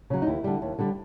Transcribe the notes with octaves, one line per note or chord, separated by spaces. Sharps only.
C#3 F#3
D#4
D#2 E4
D3 G3
D#2
D3 G3